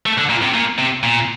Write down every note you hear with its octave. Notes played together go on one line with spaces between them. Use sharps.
A3
D3
A#2
C3
A#2
C3
A#2